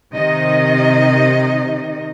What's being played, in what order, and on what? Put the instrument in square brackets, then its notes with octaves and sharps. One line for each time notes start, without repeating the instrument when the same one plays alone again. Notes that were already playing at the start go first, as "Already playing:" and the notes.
[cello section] C3 D#3 D#4 D#5